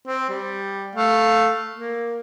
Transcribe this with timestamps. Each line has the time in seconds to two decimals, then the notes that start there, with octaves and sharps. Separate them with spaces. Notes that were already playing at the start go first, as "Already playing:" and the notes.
0.07 C4
0.30 G3
0.95 A3 F5
1.76 A#3